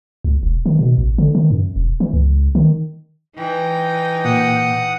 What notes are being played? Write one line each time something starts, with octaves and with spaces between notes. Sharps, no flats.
C#2
E1
D#3
B2
A1
D3
D#3
F#2
E1
E3
C#2
D#3
E3 D#4 G5
A#2 F#5 D#6